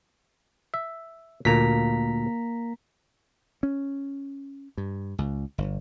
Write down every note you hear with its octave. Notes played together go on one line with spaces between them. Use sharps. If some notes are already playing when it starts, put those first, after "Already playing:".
E5
D2 A#2 A#3 A#5 B6
C#4
G2
C#2
G1